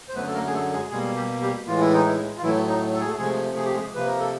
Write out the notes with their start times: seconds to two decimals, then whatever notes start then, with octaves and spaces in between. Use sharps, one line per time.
0.09 C5
0.15 F#2 D3 F#3 A3 B3 B4
0.27 A4
0.34 A#3 A#4
0.47 G#4
0.52 A3 A4
0.72 G#3 G#4
0.90 B2 G3 G#3 A#3 G#4
1.16 G3 G4
1.41 G3 G4
1.67 A2 E3 G#3 F4
1.80 E4
1.93 D#4
2.06 E3 E4
2.37 F4
2.42 A2 E3 F#3 A3 E4
2.68 D#4
2.94 A4
3.00 G#4
3.07 A3 A4
3.18 C3 F3 G#3 A3 G#4
3.56 G#4
3.65 G4
3.73 G#3 G#4
3.94 C3 F3 A#3 B4
4.07 A#4
4.19 A4